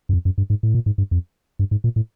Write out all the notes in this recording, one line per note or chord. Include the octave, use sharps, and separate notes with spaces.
F#2
F2
F#2
G2
G#2
A2
A#2
G#2
G2
F2
G2
G#2
A#2
A2